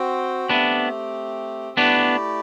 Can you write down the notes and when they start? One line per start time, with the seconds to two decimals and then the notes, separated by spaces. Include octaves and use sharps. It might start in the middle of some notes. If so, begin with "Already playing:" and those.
Already playing: C4 F#4 C5 G5
0.49 A3 B3 C4 D4 G4
1.77 A3 B3 D4 E4 G4 D5